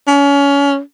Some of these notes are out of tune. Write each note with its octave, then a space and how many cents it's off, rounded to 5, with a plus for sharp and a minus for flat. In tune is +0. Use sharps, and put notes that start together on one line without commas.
C#4 +30